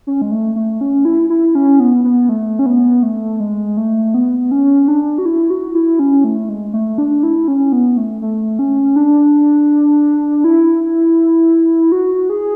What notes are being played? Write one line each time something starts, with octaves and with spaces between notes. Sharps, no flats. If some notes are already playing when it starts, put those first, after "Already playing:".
C#4
G#3
A3
A3
C#4
E4
E4
C#4
B3
B3
A3
C#4
B3
A3
G#3
A3
B3
C#4
D4
F#4
E4
F#4
E4
C#4
A3
G#3
A3
D4
E4
C#4
B3
A3
A3
C#4
D4
E4
F#4
G#4